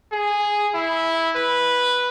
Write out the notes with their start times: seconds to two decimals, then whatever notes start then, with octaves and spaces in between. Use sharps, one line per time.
0.12 G#4
0.74 E4
1.36 B4